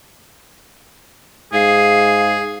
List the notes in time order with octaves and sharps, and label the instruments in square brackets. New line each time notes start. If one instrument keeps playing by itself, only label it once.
[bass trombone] G#2 [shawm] G#4 [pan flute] F5